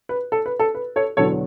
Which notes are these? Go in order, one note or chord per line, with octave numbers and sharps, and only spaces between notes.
B4
A4
B4
A4
B4
A4 C#5
E1 E2 D3 F#3 A4 C#5